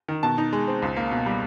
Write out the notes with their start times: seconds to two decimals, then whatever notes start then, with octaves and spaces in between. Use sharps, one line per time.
0.08 D#3
0.23 B2 A5
0.38 D#4
0.53 G#3
0.68 C4
0.82 C#2
0.97 A#3
1.11 B2
1.26 G3